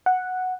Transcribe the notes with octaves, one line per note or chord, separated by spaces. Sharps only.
F#5